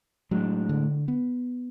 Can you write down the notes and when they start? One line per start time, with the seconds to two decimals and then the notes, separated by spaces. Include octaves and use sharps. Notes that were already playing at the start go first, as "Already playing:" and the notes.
0.31 A2 F#3 G#3 D4
0.69 D3
1.08 B3